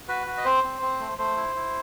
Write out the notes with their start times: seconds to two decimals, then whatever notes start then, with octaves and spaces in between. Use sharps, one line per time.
0.08 F#4 B4
0.27 F#4
0.37 D#5
0.45 C4 C5
0.64 C4
0.82 C4
1.00 A3
1.18 A3 C5
1.37 E4
1.55 E4